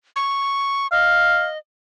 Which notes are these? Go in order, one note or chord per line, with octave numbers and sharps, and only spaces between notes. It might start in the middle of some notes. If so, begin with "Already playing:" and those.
C#6
D#5 F5